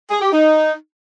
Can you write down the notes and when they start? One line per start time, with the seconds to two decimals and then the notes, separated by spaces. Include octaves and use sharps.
0.11 G#4
0.22 G4
0.33 D#4